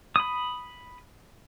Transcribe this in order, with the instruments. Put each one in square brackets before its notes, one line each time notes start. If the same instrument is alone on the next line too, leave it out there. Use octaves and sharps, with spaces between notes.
[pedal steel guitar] B5 D#6